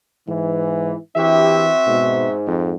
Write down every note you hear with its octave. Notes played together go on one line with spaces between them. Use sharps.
G#2 E3
E3 C4 D4 E4 F#4 G4 E5
G#2 B2
F2